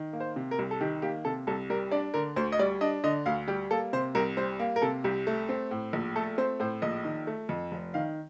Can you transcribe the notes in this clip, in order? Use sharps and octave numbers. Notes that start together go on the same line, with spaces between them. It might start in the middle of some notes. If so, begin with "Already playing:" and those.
Already playing: D#3
A#3
C5
C3
A#4
C2
A4
D#3 G4
A#3 G4
C3 A4
C2 A4
G3 A#4
D4 D5
D3 A#4
D2 C5
D#5
G3 D5
D4 D#5
D3 D#5
D2 F5
G3 G4
A#3 A4
C3 C5
C2 A#4
G3 C5
A#3
A#4
C3 A4
C2 G4
A3
C4
A2
A#1
A3 A4
C4 C5
A2 C5
A#1 D#5
D#3
A3
F2
F1
D#3 F5